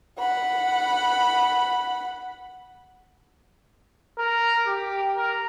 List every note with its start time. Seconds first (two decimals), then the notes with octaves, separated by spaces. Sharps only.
0.19 F#5 B5
4.18 A#4
4.66 G4
5.17 A#4